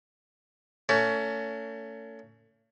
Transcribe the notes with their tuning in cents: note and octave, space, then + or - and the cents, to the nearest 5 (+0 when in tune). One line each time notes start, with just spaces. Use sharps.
A3 +35 C#4 +30